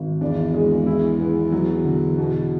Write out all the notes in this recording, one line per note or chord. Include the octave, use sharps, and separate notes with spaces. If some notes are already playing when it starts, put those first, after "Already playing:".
Already playing: G#1
E2 D4
G#3
E4
B3
F#3
D3
B2